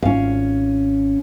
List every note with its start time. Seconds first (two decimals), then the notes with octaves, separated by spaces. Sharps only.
0.03 G#1 C#4 F4 F5